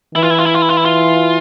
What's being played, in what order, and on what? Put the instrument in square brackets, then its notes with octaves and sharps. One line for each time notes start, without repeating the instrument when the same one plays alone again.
[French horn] E3 [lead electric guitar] E4
[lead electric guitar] F4
E4
F4
E4
F4
E4
F4
E4
F4